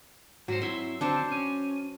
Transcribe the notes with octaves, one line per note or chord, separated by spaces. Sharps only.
G#2 F#3 F#4 C5
C4 E4 C6
D3 C4 D4 C5 A5
C#4